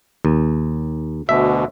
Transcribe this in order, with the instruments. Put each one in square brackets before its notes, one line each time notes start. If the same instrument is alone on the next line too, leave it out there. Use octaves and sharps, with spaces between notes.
[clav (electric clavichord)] D#2
[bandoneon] D2 B2 [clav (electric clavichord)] E5